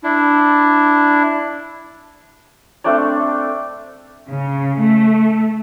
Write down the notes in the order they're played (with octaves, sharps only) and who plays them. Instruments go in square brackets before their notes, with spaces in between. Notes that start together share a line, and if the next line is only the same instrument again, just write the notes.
[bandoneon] D4 E4
[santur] A3 C4 D4 D5
[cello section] C#3
A3